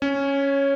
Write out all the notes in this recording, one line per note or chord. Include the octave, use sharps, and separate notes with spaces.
C#4 C#5